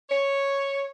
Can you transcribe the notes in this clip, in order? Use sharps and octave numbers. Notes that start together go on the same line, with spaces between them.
C#5